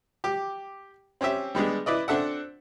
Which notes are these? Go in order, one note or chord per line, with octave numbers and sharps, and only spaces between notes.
G4 D6
C4 C#4 G4 E5
G3 G#3 B3 D4
E4 B4 D5 D#5
C4 D4 A4 E5 F#5